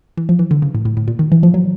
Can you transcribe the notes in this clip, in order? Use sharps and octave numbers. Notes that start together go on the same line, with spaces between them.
E3
F3
E3
D3
C#3
A2
A2
A2
A#2
D#3
E3
F3
F#3